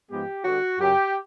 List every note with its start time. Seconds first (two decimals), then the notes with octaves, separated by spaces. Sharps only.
0.10 G#2 F3 G#3 B3 G4
0.44 D3 G3 B3 F#4
0.79 F#2 C#3 F#3 G4